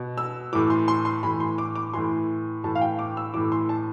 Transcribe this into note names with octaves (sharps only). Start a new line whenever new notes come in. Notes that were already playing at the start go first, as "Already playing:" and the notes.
Already playing: B2
E6
A2 E3 D6
C6
C6
C6
A2 E3 B5
C6
D6
D6
A2 E3 C6
A2 E3 A5
F5
G5
D6
E6
A2 E3 D6
C6
A5